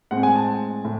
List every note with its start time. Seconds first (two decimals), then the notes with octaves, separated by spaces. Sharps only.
0.11 A2 G#3 C4 F#5
0.23 G#5
0.36 A5
0.85 A2